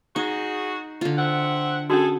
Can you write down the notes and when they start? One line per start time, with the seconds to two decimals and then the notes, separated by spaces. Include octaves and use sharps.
0.16 D#4 F#4 G#4
1.01 D3 F4
1.18 C4 E5 F#5
1.90 C#4 F#4 G#4 A4